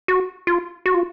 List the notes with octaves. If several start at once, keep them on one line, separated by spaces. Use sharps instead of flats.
F#4
F4
F#4
F4